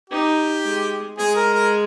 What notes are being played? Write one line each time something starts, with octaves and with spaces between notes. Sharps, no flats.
D#4 G4
G#3
G#3 G#4
A#4
A#4